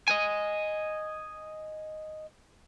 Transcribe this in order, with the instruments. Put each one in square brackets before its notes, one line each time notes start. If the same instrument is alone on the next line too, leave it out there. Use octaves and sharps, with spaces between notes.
[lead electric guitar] D#5 G#5